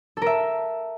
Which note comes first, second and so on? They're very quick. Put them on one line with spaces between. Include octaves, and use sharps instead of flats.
A4 A#4 E5